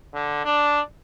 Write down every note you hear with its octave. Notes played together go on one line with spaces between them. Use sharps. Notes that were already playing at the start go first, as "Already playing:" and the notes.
D3
D4